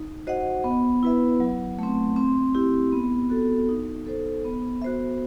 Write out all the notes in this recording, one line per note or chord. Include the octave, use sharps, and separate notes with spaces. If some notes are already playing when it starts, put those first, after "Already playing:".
Already playing: D#4
F#4 C5 D#5 F#5
B3
E4 B4 E5
F#3
A3 C4
C4
E4 G4
B3
F#4 A4
D#4
A4 C5
B3
F#4 C5 E5